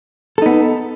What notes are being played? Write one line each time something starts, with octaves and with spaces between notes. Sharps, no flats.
B3 D#4 A4